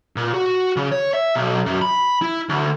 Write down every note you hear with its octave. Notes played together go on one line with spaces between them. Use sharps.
A#2
F#4
C#3
C#5
E5
B1
F#2
B5
E4
D2